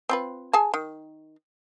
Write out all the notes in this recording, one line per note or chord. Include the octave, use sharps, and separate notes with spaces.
C4 F4 B4
G#4 G#5 A5
D#3